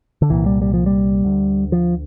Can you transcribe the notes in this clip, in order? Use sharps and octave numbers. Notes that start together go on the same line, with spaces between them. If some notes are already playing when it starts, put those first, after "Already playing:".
D3
C2 A#2 E3
G3
G3
F3
G3
D2 D3
F3